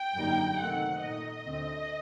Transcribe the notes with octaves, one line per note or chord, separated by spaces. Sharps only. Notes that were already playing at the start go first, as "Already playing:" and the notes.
Already playing: G5
F#2 D3 G3 A#3 D#4
C3 D#3 A3 C4 F#5
A#2 A3 D#4 D#5
D2 D3 A3 C4